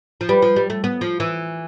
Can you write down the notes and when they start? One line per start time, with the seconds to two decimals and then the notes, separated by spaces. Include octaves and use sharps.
0.21 F3
0.29 G3 B4
0.42 F3
0.56 G3
0.70 A3
0.84 B3
1.01 F3
1.20 E3